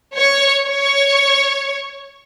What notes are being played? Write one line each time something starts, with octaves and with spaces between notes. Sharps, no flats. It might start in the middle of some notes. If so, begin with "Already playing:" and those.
C#5
C#5